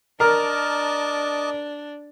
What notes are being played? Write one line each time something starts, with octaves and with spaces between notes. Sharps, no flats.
D4 A#4 D#5 A5 D6